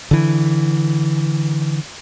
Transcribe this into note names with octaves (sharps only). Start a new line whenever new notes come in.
D3 E3